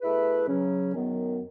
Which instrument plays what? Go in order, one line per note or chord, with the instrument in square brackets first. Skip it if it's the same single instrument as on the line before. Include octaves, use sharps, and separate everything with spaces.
[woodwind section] B2 A3 E4 G#4 B4
C#3 F#3 C#4
F#2 D#3 F#3 B3